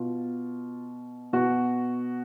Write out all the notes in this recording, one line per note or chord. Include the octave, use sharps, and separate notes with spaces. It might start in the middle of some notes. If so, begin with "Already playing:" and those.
Already playing: B2 F4
B2 F#4